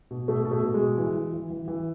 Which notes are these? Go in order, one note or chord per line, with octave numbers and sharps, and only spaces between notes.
B2
B2 A3
B2
A3
B2
G#3
B2
E3
E3
E3
E3
E3